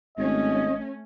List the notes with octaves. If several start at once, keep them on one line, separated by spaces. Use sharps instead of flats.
G#1 A3 C#4 D#5